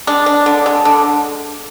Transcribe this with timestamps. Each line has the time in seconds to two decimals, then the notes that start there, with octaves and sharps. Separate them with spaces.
0.07 G#3 D4
0.26 D4
0.46 D3
0.66 G#3
0.85 D3